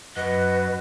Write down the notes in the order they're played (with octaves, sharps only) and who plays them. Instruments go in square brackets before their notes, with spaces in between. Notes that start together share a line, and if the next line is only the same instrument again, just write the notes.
[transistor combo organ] F#2 [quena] B4 [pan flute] D#5 [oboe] F#5